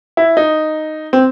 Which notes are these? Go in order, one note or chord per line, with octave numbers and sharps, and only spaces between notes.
E4
D#4
C4